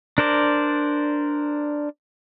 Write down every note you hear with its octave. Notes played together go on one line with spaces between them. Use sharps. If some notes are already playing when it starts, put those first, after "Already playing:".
D4 A#4 C5 D5